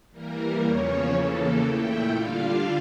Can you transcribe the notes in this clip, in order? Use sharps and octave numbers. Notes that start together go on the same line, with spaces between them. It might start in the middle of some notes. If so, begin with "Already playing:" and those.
E3 G3 A#3 A#4
E2 C#3 F3 C#4 C#5
C#3 E3 A#3 A4
A#2 A3 E4 G5
D3 G3 D4 F4 F5